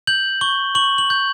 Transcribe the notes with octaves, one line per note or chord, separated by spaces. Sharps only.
G6 F#7
C#6 G7
C#6 F#7
F#7
G6